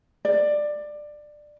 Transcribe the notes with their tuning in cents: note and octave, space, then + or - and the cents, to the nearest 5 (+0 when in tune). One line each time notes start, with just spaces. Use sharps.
D5 +15